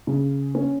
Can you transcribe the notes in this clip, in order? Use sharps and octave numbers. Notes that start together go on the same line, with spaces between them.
C#3
C#4